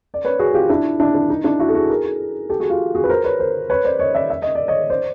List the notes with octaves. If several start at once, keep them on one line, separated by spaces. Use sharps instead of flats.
D5
B4 C#5
F#4 G#4
F4 G4
D4 E4
D4 E4
D4
D#4
D4 E4
E4 F#4
A4
F#4 G#4
G#4 A#4
G4 A4
F#4 G#4
F4 G4
F#4 G#4
B4
A#4 C5
B4 C#5
A#4 C5
B4 C#5
C5 D5
C#5 D#5
D5 E5
E5
D#5
D5
C#5 D#5
C5 D5